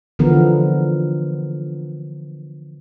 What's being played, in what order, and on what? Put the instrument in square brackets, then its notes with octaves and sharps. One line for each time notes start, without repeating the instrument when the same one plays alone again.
[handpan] D3 E3 F3 B3 A#4